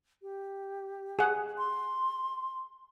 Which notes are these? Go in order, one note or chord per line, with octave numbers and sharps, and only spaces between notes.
G4
G#4 F#5
C6